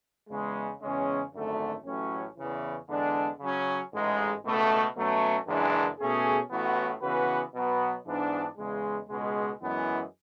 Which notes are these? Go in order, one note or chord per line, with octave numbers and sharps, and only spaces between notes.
E2 C#3 G#3
E2 C#3 G#3 C#4
G#1 F#2 D3 A3
A1 A2 F#3 C#4
E2 C#3 E3
E2 D3 G#3 D4
C#3 F#3 C#4
A1 G#2 G#3
C#2 B2 A3
B2 F#3 A3 C#4
F#1 F#2 E3 G#3 D4
B2 A3 C#4 G#4
A1 A2 E3 B3 F#4
C#3 E3 B3 F#4 B4
B2 F#3 B3 F#4
G#2 E3 B3 D4
E2 C#3 G#3
C#2 B2 G#3
F#2 E3 G#3 B3 E4